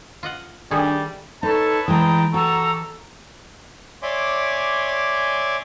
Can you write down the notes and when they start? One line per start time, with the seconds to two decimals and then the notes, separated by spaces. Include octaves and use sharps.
0.23 F4 D#5 F#5
0.71 D#3 G3 A3 D4 G#4
1.43 D#4 A4 B4 C#5 A5
1.88 E3 G#3 G5 A5 A#5 D#6
2.34 G3 F#4 A4 A#5 C#6 E6
4.02 C#5 D5 E5 G#5 C6 D6